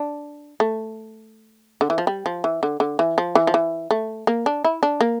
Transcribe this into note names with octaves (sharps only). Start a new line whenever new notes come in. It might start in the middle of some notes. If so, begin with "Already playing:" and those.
Already playing: D4
A3
D3
E3
F3
G3
F3
E3
D3
D3
E3
F3
E3
F3
E3
A3
A#3
D4
E4
D4
A#3